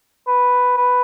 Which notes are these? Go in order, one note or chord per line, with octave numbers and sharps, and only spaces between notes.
B4
B4